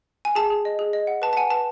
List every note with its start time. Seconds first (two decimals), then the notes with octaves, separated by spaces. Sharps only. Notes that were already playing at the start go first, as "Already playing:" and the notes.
0.25 G#5
0.35 G#4 A5
0.50 G#4
0.65 D#5
0.79 G#4
0.93 D#5
1.07 F#5
1.22 B4 A5
1.33 A5
1.37 F#5 G#5
1.50 B4 A5